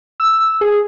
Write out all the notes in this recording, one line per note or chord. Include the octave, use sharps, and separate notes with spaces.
E6
G#4